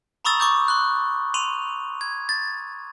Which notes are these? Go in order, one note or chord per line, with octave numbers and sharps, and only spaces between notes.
A#5 B5 C#6 D#6 E6 A6
C#6 D6 G6
C6 F#6
C6 D#7 F7
G#6
A6